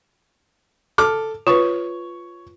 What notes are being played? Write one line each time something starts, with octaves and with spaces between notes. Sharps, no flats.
A4 D6 F6
F4 B4 C#5 C#6